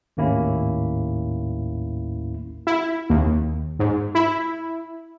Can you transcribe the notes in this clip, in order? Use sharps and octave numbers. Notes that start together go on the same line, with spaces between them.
G#1 D#2 A2 A#3 C#4 E4
E4
D#2
G#2
E4